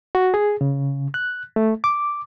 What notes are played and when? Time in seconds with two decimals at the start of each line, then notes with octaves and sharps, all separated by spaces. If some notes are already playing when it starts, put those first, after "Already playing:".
0.15 F#4
0.34 G#4
0.61 C#3
1.14 F#6
1.56 A3
1.84 D6